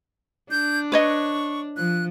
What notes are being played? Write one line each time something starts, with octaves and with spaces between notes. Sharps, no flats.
D4 G6
B4 C#5 D#5 C#6
F3 F#6